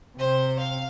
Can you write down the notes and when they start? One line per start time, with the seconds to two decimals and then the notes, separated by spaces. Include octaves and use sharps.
0.19 C3 C5
0.59 F5